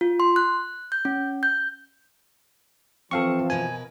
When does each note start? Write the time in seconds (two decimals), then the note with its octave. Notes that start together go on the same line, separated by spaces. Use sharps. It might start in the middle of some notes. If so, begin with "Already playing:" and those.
0.01 F4
0.20 C6
0.36 F#6
0.92 G6
1.05 C#4
1.43 G6
3.11 E3 F3 C4 A4 F5 A5 C#6
3.50 B2 A#4 B4 G#5